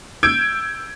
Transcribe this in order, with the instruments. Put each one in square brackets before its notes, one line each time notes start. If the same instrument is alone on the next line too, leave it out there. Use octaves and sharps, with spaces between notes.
[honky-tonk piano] E6 G6 G#6 D7